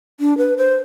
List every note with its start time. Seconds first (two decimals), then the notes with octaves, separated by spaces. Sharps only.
0.20 D4
0.38 B4
0.58 C5